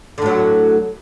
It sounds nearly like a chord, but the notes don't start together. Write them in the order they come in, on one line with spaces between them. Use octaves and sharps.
D3 A2 F#3